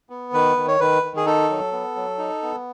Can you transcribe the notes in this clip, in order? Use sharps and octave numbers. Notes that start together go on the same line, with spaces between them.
B3
D#3 B4
D#3
C#5
D#3 B4
D#3
G#4
D#4 A4
F#3
B3
F#3
D#4
B3